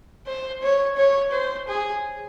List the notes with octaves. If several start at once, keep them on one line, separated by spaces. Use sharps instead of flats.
C5
C#5
C#5
C5
G#4